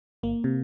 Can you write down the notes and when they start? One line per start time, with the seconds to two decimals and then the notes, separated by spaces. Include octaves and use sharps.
0.23 G1 A#3
0.44 C3